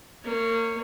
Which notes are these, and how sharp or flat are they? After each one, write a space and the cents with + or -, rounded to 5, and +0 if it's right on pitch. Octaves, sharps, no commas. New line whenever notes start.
A#3 -30 C#5 +0